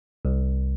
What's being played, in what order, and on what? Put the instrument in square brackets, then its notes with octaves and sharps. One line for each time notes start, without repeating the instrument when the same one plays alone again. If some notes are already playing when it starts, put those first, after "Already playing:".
[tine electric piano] C2